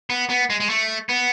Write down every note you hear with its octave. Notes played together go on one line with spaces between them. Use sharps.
B3
B3
G#3
G#3
A3
B3